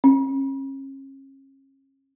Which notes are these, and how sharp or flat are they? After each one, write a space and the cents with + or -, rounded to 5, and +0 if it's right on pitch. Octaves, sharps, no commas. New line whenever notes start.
C#4 -40